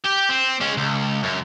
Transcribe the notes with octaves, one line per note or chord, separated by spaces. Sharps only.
G4
C4
G#3 C#4
C#2
F#2